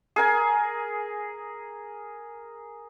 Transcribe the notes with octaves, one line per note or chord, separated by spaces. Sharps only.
G#4 A#4 G#5